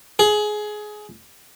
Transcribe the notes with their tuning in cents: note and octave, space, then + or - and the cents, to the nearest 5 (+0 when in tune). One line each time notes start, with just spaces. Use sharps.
G#4 +20